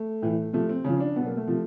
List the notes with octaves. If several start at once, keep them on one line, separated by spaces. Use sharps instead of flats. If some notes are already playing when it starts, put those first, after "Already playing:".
Already playing: A3
A2 E3
C3 F3 A3
C4
C#3 F3 C#4
D4
B2 F#3 B3
A#3
A3
C3 F3